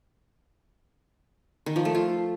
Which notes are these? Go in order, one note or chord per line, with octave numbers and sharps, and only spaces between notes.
D#3
F3
A3
F4